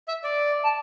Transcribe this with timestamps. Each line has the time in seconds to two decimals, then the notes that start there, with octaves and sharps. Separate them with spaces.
0.08 E5
0.24 D5
0.63 A5